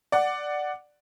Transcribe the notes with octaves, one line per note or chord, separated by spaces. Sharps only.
D5 F#5